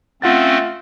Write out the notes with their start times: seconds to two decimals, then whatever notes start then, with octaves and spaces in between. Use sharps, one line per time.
0.22 A3 C4 C#4 F4 F#5 A6